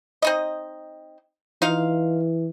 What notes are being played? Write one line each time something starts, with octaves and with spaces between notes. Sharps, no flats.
C4 D#4 D#5
E3 D#4 F4 F5